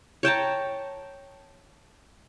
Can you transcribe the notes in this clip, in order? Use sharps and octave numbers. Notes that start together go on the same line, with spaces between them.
C#5 G5 A5 A#5